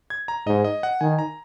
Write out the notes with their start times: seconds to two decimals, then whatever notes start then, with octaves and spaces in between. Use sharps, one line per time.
0.10 G#6
0.28 A#5
0.46 G#2 D#5
0.64 D#5
0.83 F#5
1.01 D#3 G#5
1.19 A#5